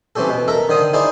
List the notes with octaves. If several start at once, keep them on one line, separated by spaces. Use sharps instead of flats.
E3 C4 C#4 G4 A4
B2
A4 A#4 E5
D3 D#3 C5 D#6
D#4 E4 G#4 C5 D5